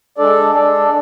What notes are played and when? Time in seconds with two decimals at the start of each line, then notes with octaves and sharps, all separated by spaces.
0.18 G#3 D4 A4 D5
0.54 G#3 D4 A4 D5